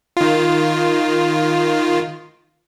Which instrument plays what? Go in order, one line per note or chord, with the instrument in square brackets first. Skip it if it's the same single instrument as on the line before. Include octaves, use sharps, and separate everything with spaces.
[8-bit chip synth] D#3 F4